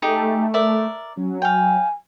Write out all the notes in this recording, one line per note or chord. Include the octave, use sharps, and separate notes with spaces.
A3 D#4 G4 G#4
A#4 D5 E5
F#3 C#4
F5 G5 G#5